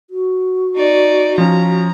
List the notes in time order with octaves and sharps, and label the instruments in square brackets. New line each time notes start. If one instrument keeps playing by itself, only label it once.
[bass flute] F#4
[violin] D#4 D5
[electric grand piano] F3 C#4 [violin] A#5